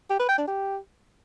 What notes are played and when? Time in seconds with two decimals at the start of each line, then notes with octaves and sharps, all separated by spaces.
0.10 G4
0.19 B4
0.29 G5
0.38 D4
0.47 G4